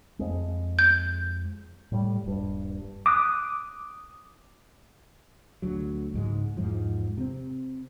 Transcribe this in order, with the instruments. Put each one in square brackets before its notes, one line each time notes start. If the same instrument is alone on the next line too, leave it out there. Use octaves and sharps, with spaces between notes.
[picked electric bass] F2 G#3
[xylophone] G6
[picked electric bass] A2 G3
D#1 G2
[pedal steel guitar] D6 D#6 F#6
[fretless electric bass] D2 F#3
C#2 G#2 G#3
E2 G#2 F3
C3 C4